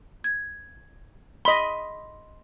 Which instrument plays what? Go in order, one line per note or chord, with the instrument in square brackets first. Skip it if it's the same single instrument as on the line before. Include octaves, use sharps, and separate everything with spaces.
[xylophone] G#6
[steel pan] D#5 B5 [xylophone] C6 B6